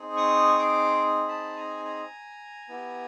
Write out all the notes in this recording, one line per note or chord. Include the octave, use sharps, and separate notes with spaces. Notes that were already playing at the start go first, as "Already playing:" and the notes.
Already playing: C4 D#4 G#4
C#6 D#6
C6 D6
A5 B5
G#5 A#5
G#5 A#5
B3 E4 G4